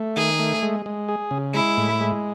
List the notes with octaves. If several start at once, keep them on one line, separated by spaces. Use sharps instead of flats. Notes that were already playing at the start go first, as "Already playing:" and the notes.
Already playing: A3
D#3 G#4
A3
G#3
G#3
G#4
C#3
G#3 E4
A2
G#3